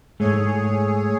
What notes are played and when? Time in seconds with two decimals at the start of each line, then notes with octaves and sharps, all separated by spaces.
0.20 G#2 G#3 A3 G#4 C#5